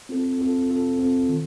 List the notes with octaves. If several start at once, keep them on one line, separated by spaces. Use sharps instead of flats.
C4 F4 A4
C4 F4 A4
C4 F4 A4
C4 F4 A4
D#3